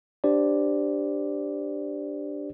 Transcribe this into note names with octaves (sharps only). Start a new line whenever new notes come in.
D4 G4 C5 D5